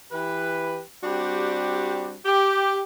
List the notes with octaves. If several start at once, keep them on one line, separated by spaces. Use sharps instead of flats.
E3 G4 B4
G3 C4 D4 F#4 G4
G4